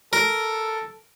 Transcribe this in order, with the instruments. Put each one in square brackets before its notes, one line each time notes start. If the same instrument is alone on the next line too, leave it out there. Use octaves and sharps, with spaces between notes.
[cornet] A4 [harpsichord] A#4